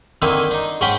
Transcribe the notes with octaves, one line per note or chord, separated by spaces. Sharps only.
D3 D#3 A#3 C4 E4
D4 D#4
G#2 G#3 C#4 F#5 G5 B5